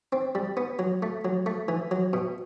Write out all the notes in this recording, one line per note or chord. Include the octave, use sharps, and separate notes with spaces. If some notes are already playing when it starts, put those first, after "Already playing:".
C4
G3
B3
F#3
A3
F#3
A3
E3
F#3
B2